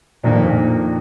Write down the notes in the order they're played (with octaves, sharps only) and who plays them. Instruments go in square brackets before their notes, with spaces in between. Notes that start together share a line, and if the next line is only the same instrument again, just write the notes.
[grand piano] F2 D#3 A#3 D4 [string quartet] A#2